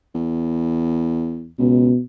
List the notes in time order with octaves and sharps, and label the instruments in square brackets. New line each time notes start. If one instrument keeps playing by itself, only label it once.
[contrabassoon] E2
[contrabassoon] C#2 [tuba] B2